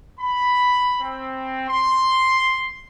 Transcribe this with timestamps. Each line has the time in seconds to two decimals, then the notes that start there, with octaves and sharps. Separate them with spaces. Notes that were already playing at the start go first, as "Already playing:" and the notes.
0.19 B5
1.01 C4
1.68 C6